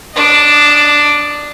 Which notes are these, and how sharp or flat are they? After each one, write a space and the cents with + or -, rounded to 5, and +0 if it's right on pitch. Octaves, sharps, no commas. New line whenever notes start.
D4 +0 D#5 -25